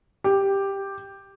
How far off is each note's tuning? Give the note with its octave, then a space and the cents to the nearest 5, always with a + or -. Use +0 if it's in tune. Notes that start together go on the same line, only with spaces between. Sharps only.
G4 +5